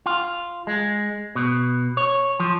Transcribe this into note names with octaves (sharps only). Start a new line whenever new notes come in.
F4
G#3
B2
C#5
F3